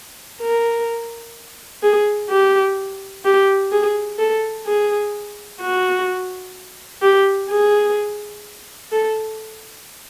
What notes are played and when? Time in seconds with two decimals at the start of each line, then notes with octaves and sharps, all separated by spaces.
0.41 A#4
1.83 G#4
2.30 G4
3.25 G4
3.72 G#4
4.19 A4
4.67 G#4
5.61 F#4
7.02 G4
7.50 G#4
8.92 A4